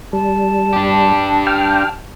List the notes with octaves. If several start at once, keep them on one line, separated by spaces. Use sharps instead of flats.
G3 A5
D4 G4
G5 F6